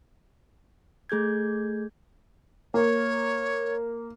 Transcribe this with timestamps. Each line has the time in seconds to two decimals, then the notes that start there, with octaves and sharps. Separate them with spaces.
1.09 A3 G#4 G6 G#6
2.74 A#3 C#5